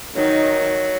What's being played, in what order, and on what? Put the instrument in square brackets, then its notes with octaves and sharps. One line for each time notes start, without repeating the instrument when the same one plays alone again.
[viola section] D#3 D#4 [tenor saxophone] F#3